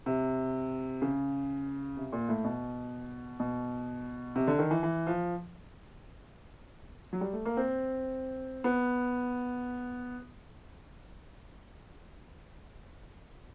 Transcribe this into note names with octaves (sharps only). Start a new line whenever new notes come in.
C3
C#3
C3
A#2
A2
B2
B2
C3
D3
D#3
E3
E3
F3
F#3
G3
A3
A#3
C4
B3